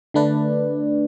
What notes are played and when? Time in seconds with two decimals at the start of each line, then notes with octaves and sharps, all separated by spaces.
0.14 D3 A3 D4 B4 D5